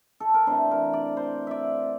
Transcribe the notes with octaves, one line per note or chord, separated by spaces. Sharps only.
A4
A#4
C3 E3 A3 D4 C5
A#4
D5
C5
D5 E5